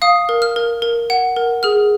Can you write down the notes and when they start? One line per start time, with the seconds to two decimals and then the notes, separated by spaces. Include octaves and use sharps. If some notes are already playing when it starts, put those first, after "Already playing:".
0.02 F5 D#6
0.29 A#4
0.42 F6
0.56 A#4
0.82 A#4
1.10 F#5
1.36 A#4
1.63 G#4 F6